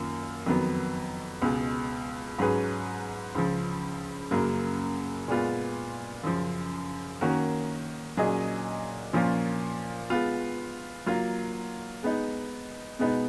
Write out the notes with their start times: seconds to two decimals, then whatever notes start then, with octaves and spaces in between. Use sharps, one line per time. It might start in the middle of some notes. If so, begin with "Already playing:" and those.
Already playing: F#2 D#3 A#3 F4
0.46 F2 D#3 F#3 B3
1.42 C#2 B2 G#3
2.39 G#2 F#3 C#4 G#4 B4
3.35 C#2 C#3 F3
4.31 F#2 C#3 F#3 A#3
5.28 A#2 G#3 B3 F4
6.24 F#2 C#3 F3
7.21 D#3 A#3 C#4 F#4 A#4
8.17 A#2 F#3 C#4 G#4 D#5
9.13 A#2 F3 A#3 C#4 F4
10.10 G#3 B3 F4
11.06 F#3 A#3 F4
12.03 G#3 B3 D#4
12.99 B2 G#3 B3 D#4